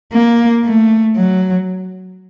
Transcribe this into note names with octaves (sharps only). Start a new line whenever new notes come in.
A#3
A3
F#3